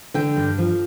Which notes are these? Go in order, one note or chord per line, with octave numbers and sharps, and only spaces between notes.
D3 G5
G2
F3